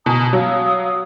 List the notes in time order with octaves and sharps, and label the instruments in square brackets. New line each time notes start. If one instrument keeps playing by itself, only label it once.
[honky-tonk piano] B2 [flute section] G#5 A#5 D#6
[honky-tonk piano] F#3 [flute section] F5 D#6